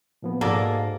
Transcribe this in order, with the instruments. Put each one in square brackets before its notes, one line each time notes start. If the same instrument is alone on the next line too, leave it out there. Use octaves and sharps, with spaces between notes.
[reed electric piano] A#2 F3 B3
[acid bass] G#2 [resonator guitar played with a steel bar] A#3 [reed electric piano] F#4 G#4 [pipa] A4 D5